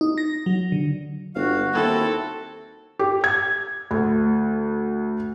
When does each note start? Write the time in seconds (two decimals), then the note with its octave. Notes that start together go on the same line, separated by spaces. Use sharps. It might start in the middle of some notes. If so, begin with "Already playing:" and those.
0.01 D#4
0.18 A#6
0.46 F#3
0.72 D3
1.35 G1 F#4 F5
1.74 D#2 C4 E4 A4
2.99 G4
3.24 G#6
3.91 D2